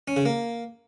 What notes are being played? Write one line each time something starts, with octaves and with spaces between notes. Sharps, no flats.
C#4
C#3
A#3